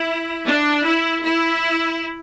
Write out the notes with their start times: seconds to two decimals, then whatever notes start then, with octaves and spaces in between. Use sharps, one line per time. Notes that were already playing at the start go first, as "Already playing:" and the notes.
Already playing: E4
0.47 D4
0.84 E4
1.23 E4